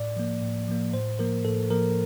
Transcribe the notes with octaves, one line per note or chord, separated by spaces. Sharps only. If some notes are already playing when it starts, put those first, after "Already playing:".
Already playing: A2 D5
F3 A#3
A2
F3 A#3
A2 C5
F3 A#3 A#4
A2 A4
F3 A#3 A#4